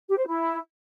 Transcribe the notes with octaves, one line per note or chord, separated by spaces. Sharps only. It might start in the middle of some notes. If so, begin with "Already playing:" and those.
G4
C5
E4